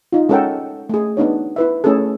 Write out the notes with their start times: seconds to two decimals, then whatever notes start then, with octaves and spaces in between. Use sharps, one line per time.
0.12 D#4 F4
0.29 G#3 C#4 A4 A#4 F#5 G5
0.89 A3 G#4
1.17 B3 D4 D#4 C#5
1.56 E4 B4 E5
1.84 A3 C#4 E4 G#4 A4